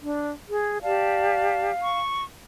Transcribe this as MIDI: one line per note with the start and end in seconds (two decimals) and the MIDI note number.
0.02 0.31 62
0.49 0.78 68
0.82 1.70 67
0.82 1.70 74
0.82 1.99 77
0.82 1.70 81
1.82 2.23 85